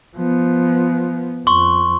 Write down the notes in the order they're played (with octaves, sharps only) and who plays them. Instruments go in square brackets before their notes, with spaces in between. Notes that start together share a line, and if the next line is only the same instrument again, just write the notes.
[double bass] F3 B3
[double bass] F2 [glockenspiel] C6 C#6